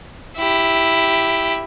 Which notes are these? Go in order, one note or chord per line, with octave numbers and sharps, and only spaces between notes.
E4 G4